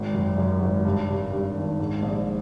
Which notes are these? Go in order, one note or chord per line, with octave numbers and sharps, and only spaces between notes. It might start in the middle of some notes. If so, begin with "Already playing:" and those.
Already playing: G#1
F#2
F#2
G#1
G2
G2
G2
D#3
G#2
A#1